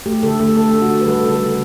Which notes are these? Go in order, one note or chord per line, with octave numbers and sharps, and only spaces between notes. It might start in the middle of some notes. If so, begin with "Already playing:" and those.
A3 G4
D3 A4
A3 A4
A3 A4
D3
F#4
D3
B4
G3 A4
C#3
A4
G3